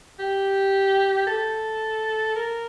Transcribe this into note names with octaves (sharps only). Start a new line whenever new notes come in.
G4
A4
A#4